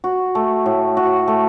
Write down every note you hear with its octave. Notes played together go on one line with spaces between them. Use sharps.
F#4
A3
A2
F#4
A3